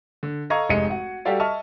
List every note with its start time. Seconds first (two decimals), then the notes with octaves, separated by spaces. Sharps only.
0.23 D3
0.50 A4 D#5 F5 A#5 C#6 G#6
0.70 F1 G#2 G#3 D#4 C#7 D#7
0.90 F#4 F#5
1.25 G3 F#4 G4 A4 D5 F5
1.40 D#5 E5 A5 C#6 F6